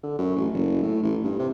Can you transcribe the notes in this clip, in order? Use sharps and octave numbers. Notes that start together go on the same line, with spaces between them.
D3
F#2
A1
F#1
A2
A1
G2
C3